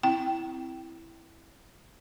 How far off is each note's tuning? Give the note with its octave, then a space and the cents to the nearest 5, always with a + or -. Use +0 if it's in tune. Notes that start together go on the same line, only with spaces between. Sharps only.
C4 +0 E4 +0 G5 -20